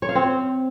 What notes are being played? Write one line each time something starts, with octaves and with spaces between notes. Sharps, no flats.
C#5
F5
C4